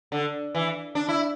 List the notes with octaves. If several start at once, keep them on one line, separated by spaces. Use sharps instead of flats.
D3
E3
D4
E4